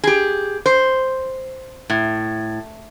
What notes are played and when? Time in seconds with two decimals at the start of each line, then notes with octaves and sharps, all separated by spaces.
0.04 G4 G#4
0.66 C5
1.90 A2